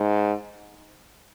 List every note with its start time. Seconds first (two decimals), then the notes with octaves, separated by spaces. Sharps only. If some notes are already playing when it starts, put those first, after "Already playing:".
Already playing: G#2